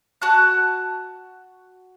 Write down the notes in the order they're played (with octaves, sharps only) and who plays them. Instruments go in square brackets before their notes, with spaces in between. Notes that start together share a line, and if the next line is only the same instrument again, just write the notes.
[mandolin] F#4 A5 F#6